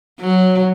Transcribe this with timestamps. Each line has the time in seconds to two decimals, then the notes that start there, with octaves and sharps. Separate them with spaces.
0.21 F#3